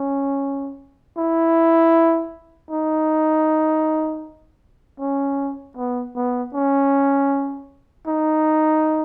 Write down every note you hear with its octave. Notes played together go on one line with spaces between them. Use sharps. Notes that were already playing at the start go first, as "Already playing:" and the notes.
Already playing: C#4
E4
D#4
C#4
B3
B3
C#4
D#4